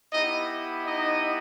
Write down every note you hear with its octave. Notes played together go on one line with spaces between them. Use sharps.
B3 D#4 E4 G4 D#5
D#4 D#5